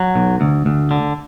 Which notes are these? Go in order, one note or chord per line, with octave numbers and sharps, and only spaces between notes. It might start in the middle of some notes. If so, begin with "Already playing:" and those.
Already playing: F#3
B1
D2
D2
D3